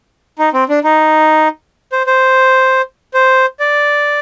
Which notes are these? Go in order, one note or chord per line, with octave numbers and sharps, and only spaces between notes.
D#4
C4
D4
D#4
C5
C5
C5
D5